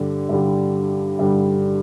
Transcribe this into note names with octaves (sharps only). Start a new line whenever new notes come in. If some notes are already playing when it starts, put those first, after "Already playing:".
Already playing: G2 D3 G3
G2 D3 G3
G2 D3 G3